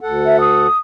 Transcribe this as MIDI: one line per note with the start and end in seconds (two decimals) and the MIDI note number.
0.01 0.67 38
0.01 0.67 69
0.01 0.67 78
0.26 0.39 76
0.40 0.78 87